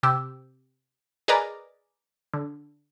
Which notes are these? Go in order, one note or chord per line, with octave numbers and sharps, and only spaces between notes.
C3 G4 E6
G#4 A#4 B4 D5 D#5 A#5
D3